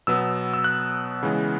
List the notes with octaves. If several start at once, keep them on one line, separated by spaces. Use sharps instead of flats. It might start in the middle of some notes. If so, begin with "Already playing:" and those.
B2 F#3 B3 E6
E6
F#6
C#3 E3 G#3 B3